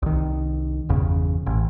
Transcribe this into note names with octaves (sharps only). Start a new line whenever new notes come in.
C2 D#3
G1 E2 C#3
A1